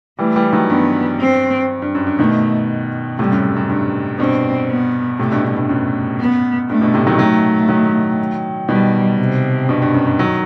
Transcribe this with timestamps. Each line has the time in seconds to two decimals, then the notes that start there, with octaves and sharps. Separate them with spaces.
0.19 E3 G3 A3
0.36 E3 G3
0.53 D#3 F#3
0.69 G2 B3
1.20 C4
1.82 G2
1.95 F#2
2.07 G2
2.19 B2 D#3 A3
3.19 A2 C3 G3
3.31 F#2 A2
3.56 F#2
3.69 G2
4.19 G2 B2 C4
4.70 B3
5.19 A2 C3 A3
5.32 G2 B2
5.44 G2
5.57 G2
5.69 F#2
6.20 B3
6.69 G2 A3
6.81 G2 B2
6.94 A2 C3
7.07 D#3 F#3
7.19 D#3 F#3 A3
7.69 D#3 F#3
8.69 B2 D#3 G3
9.19 C3
9.69 G2 B2
9.82 G2
9.94 F#2
10.07 G2
10.19 D#3 F#3